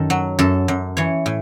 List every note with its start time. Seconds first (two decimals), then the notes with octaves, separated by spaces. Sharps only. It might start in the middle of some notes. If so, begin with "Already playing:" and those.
Already playing: F#2 D#3 A4
0.10 F#3
0.39 F#2 A4
0.68 F#2
0.97 E3 C#5
1.26 A2